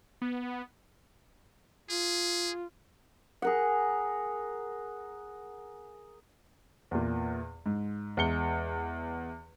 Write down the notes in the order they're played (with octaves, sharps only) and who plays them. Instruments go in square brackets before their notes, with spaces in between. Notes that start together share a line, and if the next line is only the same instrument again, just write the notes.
[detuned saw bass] B3
[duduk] F4 [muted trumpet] G#4
[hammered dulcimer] G#4 A#4 F#5
[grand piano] E2 A#2
G#2
E2 G#3 C#7 G7